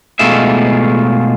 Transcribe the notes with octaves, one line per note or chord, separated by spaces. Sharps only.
B2 G#3 A3 F4 G#4 E5